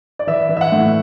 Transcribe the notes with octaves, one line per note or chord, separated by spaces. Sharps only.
D5
E3 E5
E3
E5
F#5
A2